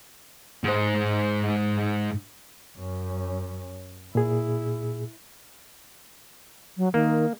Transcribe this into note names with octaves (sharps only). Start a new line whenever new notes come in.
G#2 C5
F#2 C#4
A#2 E4 G#4
F#3
D#3 A#3